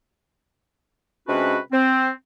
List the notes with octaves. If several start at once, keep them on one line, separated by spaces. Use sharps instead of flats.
C3 G#3 C#4 D4 F#4 B4
C4